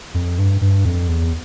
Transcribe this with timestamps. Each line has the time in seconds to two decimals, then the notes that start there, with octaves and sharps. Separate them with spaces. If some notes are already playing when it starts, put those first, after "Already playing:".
0.14 F2
0.39 G2
0.61 G2
0.85 F2
1.08 E2